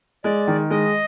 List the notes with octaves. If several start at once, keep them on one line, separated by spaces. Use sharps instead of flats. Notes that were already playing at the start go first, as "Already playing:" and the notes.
G#3 D5
D#3
G#3 D#5